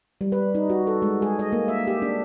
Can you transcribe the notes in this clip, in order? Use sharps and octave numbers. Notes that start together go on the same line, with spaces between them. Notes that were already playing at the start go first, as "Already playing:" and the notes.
G3
B4
D#4
F#4
A4
G#3
G#4
D#5
A#3
E5
G4
D4